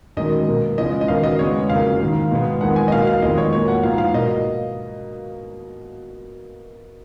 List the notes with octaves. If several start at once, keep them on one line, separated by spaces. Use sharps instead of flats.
F#2 D#3 G#3 D#5
B2 A#3
C#3 F3 G#3 B3 D#5
D#5
F#2 D#3 F#3 B3 F5
D#5
C#3 G#3 B3 C#5
F2 C#3 F#3 A#3 F5
G#2 D#3 A#3
B2 G#3 B3
F2 D#3 G#3 B3 F#5
G#5
D#5
B2 F#3 A#3 F5
F5
F2 D#3 G#3 B3 D#5
C#5
A#2 F#3 A#3 C#5
F#5
G#2 F3 B3 F5
F5
B2 F#3 A#3 D#5